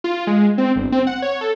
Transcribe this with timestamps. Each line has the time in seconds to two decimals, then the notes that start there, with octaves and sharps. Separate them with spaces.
0.04 F4
0.27 G#3
0.58 C4
0.76 G1
0.92 C4
1.07 F#5
1.22 C#5
1.41 A4